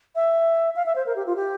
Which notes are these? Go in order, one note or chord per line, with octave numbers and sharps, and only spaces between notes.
E5
F5
E5
C5
A#4
G4
F4
G4